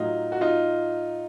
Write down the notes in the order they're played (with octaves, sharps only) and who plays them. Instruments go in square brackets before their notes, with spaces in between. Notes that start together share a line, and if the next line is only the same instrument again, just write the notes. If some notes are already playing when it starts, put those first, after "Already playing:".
Already playing: [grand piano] A2 F#3 D#4 F4
F#4
D#4 F4